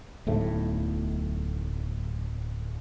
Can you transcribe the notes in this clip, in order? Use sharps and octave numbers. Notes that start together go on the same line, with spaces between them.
D1 B1 A2 A3